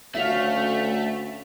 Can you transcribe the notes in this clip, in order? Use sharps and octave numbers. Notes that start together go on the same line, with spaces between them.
D2 A3 C#4 F#4 E5 F5 B6 F7